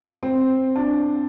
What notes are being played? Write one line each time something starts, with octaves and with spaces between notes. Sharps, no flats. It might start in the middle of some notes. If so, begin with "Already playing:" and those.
C4
D4